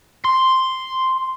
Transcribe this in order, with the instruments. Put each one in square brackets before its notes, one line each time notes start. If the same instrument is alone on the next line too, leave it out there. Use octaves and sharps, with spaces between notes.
[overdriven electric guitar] C6